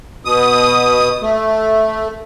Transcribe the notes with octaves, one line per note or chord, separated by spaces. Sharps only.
B2 D#6
A3